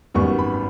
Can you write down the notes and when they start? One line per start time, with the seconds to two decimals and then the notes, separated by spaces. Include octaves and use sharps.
0.14 G#1 F#2 D#3 G3 B3 C#6
0.39 B5